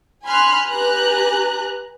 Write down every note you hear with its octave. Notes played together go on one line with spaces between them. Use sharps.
G#5 B5 C6 F6 F#6
G4 B4 G#5 A#5 F#6